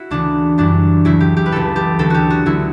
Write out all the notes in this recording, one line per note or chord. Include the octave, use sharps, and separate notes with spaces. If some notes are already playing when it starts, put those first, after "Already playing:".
Already playing: E4 F#4
D2 C#3 E3 D4
F#2 E3 G3 D4
D2 C#3 F#3 E4
G4
G4
B4
C#2 C#3 E3 A4
G4
D2 D3 F#3 A4
F#4 G4
F#4
D2 D3 F#3 E4